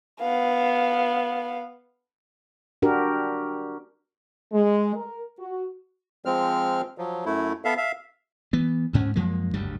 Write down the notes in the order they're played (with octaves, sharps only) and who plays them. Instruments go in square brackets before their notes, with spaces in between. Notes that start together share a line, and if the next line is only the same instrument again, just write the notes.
[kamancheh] B3 F5
[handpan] D4 F#4 G4 A#4
[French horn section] G#3
A#4
F#4
[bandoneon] F3 G#3 C4 F6
F3 F#3
F#2 A3 E4
B3 A4 E5 F5
E5 F5
[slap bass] E3 B3
D2 G#2 C#4
F#2 F3 G#3 A#3
F#1 D2 G2 G3